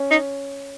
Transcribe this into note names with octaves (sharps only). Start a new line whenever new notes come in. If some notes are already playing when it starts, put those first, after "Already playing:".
Already playing: C#4
D#4